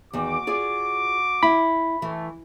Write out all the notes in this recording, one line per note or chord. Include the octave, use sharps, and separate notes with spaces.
E2 D#3 F#4 D6
F4 G#4 D5
E4 B5
E3 A3